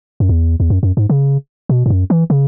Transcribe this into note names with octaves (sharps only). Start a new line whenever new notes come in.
F#2
E2
E2
F#2
F#2
G#2
C#3
B2
G#2
F#2
E3
C#3